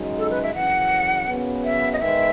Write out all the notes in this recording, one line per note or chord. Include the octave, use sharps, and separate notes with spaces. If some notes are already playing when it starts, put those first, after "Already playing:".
Already playing: F#2 C#3 G#3 D#4 F#4
A4
B4
E5
F#2 C#3 E3 F#5
F#2 C#3 F#3 B3
E5
D#5
G#2 D#3 G#3 B3 E5